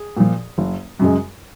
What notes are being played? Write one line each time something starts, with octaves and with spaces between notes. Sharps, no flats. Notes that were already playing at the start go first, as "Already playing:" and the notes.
Already playing: G#4
A#2 F3
F#1
F#2 C#3 G#3